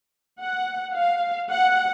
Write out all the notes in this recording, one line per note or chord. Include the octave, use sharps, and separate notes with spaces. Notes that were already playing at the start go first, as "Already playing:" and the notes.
F#5
F5
F#5